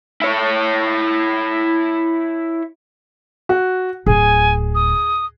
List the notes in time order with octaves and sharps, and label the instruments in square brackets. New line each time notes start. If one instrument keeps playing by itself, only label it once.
[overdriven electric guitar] E4 C#5
[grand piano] F#4
[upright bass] D1 [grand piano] G#4 [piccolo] G#5
[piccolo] D#6